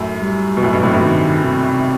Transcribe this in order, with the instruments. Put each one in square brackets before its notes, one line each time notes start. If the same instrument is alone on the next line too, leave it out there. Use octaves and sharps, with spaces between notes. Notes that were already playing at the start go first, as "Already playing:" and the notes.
Already playing: [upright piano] F#2 A2
[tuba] G3
[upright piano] B2
[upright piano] F#2 A2 [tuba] F#3
[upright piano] G2 B2
A2 C3
G2 B2
[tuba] D#3
C3